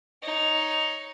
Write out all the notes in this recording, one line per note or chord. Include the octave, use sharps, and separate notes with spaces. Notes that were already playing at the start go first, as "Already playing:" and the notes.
D#4 C#5